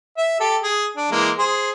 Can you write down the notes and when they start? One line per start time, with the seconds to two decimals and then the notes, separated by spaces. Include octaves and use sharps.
0.17 E5
0.40 G4 A4
0.63 G#4
0.97 D4
1.11 E3 G#3 A#3
1.39 G#4 C5